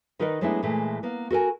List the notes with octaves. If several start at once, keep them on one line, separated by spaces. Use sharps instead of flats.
D#3 D#4 A#4 B4 D5 D#5
F#3 G#3 A3 B3 D4 E4
A#2 E3 G#3 A3
A#3 B3
F#4 A4 A#4 G#5